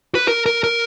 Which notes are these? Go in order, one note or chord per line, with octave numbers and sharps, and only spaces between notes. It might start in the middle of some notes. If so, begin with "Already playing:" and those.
B4
A#4
A#4
A#4